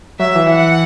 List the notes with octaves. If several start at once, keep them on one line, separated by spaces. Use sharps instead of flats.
F#3 E5
E3
F#5